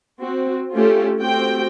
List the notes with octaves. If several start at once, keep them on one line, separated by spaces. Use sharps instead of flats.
C4 F#4
A3 C#4 F4 G4 A4
A3 C4 F#4 G4 G5